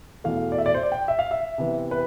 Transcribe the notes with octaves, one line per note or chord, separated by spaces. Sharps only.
E2 B2 A3 F5
D5
E5
D5
C5
D5
G5
E5
F5
E5
C3 E3 B3
B4